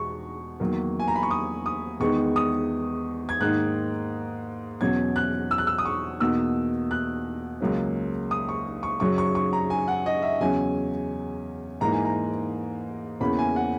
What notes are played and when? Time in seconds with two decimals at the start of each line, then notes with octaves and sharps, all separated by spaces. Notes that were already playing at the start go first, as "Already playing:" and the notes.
Already playing: E2 B2 G#3 C#6
0.60 E2 D#3 F#3 A#3
1.00 G#5
1.08 A#5
1.16 B5
1.23 C#6
1.31 D#6
1.66 D#6
2.00 E2 D#3 G#3 B3 D#4 C#6
2.36 D#6
3.29 G#6
3.40 G#2 D#3 A#3 D#4 F#6
4.81 E2 B2 F#3 C#4 G#6
5.16 F#6
5.51 E6
5.58 F#6
5.67 E6
5.78 D#6
5.85 C#6
6.20 E2 B2 A#3 D#4 E6
6.91 F#6
7.61 C#2 C#3 F#3 A#3 C#4
8.31 D#6
8.49 C#6
8.83 C#6
9.00 F#2 C#3 F#3 C#4 C#6
9.18 C#6
9.35 C#6
9.53 A#5
9.70 G#5
9.88 F#5
10.06 D#5
10.22 E5
10.40 E2 C#3 F#3 C#4 G#5
11.80 G#2 E3 A#3 D#4 A#5
11.92 G#5
12.05 A#5
13.20 E2 C#3 E3 A#3 C#4 B5
13.39 G#5
13.56 F#5